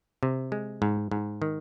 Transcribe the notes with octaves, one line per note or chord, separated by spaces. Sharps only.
C3
G#3
G#2
G#2
D#3